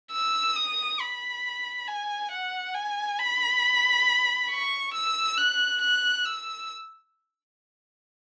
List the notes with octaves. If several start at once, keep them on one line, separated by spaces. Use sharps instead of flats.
E6
D#6
B5
G#5
F#5
G#5
B5
C#6
E6
F#6
F#6
E6